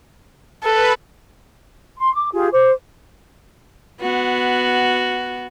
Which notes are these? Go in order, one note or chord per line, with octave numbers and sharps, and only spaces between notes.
A4 B4
C6
D6
F4 G4 G#4
C5 D6
B3 F#4